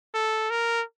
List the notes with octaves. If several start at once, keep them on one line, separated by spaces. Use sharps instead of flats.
A4
A#4